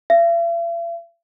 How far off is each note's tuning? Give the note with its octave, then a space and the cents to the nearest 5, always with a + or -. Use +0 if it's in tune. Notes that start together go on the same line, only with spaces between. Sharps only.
E5 +45